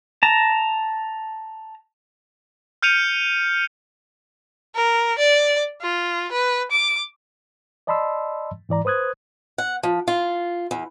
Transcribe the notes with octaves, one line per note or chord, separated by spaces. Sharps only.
A5 A#5
F6 G6 C#7 D#7 F7
A#4
D5
F4
B4
D6
D5 D#5 A5 B5 C6 E6
G#2 E3 D5 A#5
B4 C5 D#6 F#6 G#6
F#5
F3
F4
E2